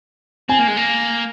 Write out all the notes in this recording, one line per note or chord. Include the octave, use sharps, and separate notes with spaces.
C4 G#5
A#3
G#3
A#3